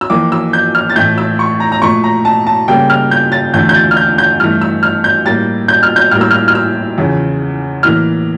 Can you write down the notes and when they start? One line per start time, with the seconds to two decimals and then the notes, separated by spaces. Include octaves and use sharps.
0.01 E6
0.10 F2 E3 A#3 D6
0.32 E6
0.53 G6
0.75 F6
0.90 A6
0.96 A2 E3 A3 G6
1.18 E6
1.39 C#6
1.60 A#5
1.72 A#5
1.82 A#2 F3 A3 C#6
2.04 A#5
2.25 A5
2.47 A5
2.68 C#3 G3 A#3 G5
2.90 F6
3.11 G6
3.32 A6
3.54 E2 D3 A3 G6
3.69 G6
3.75 A6
3.91 F6
3.97 G6
4.18 G6
4.39 G2 E3 A3 F6
4.61 E6
4.83 F6
5.04 G6
5.25 A2 G3 A#3 A6
5.68 G6
5.83 F6
5.96 G6
6.11 A2 G3 A#3 F6
6.21 E6
6.31 F6
6.48 F6
6.55 E6
6.98 E2 C#3 F3
7.83 A2 E3 A#3 F6